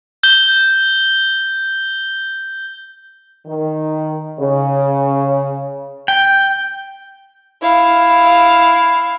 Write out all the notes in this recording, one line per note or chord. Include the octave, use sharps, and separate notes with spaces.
G6 G7
D#3
C#3
G5
E4 F5